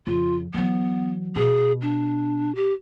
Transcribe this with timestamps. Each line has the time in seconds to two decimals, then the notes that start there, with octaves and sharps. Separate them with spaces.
0.07 F2 C#3 F4
0.54 E3 F#3 B3
1.36 B2 G#4
1.82 D4
2.55 G4